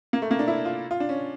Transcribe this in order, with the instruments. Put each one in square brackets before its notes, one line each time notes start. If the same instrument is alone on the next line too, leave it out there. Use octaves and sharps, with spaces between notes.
[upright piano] A#3
A3
A#3
D4
E4
F4
F4
D4
C#4